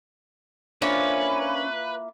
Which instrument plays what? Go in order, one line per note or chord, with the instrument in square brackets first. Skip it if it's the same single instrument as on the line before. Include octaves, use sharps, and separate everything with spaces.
[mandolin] A#3 E4 F4 [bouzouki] C#4 [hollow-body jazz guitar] D4 C5 [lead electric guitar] B4